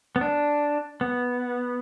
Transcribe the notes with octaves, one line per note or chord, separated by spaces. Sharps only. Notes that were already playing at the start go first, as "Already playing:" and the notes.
B3
D4
B3